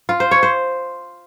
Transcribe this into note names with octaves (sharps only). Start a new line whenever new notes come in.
F4
C5
C#5
C5